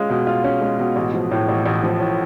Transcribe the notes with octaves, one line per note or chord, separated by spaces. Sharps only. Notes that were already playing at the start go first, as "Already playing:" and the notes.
Already playing: G#3 C#4 F4
B2
F4
C#4
G#3
B2
A1
F3
A2
A1
A1
F3
A2